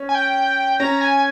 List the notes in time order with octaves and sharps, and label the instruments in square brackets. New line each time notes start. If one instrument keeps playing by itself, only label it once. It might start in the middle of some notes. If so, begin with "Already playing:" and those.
Already playing: [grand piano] C#4
[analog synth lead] G#5
G5
[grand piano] C#4 [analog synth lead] A#5
[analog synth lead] G#5